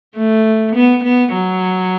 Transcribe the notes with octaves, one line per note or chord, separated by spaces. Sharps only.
A3
B3
B3
F#3